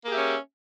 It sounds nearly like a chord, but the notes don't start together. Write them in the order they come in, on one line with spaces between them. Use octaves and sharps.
A#3 G#4 G4 E5 C#4